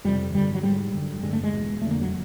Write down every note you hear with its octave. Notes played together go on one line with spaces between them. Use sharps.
F2 C3 G3
G2 D3 G3
F#3
G#2 G3
F#2 D3
G2 D3 G#3
A3
G#3
E2 B2
F2 D3 A3 A#3
F#3